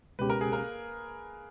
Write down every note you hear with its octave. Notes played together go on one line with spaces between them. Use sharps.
C#2 B2 G#3 C#4 G4 B4
A#4
G#4
A#3 A#4